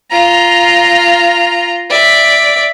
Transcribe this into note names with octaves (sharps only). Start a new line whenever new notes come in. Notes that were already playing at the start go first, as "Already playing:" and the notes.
F4 A#5
D5 E5